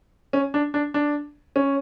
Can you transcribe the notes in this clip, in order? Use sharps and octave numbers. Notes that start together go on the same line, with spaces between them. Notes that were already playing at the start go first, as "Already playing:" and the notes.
C#4
D4
D4
D4
C#4